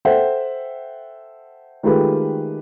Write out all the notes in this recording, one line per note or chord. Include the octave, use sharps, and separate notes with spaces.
A4 C5 E5 F#5 G5
D#3 G#3 A3 F4 G4 B4